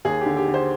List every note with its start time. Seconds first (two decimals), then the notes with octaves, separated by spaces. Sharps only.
0.05 D#2 G#4
0.21 G4
0.26 D3
0.37 G4
0.48 D3
0.54 C5